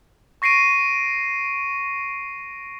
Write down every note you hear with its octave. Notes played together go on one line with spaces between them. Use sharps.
C#6 A#6 C7 D7 D#7